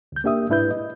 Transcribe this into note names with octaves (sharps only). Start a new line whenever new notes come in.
D2 G6
A#3 D4 G4 E5 D#6
G#2 D4 E4 B4 G6
D#5